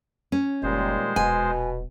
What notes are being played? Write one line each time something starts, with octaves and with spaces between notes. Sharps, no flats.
C#4
F#1 A#2 D#3 G3 G#3 C5
D#1 B2 G#5